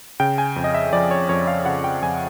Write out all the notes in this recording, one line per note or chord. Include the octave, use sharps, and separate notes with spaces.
C#3 G5
G#5
F2
D#5
E5
F3 D5
C#5
F2 C#5
F5
C#3 F#5
G5
F2 G#5